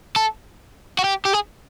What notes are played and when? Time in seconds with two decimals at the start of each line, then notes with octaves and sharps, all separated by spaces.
0.16 A4
0.99 F#4
1.04 G4
1.25 G4
1.33 G#4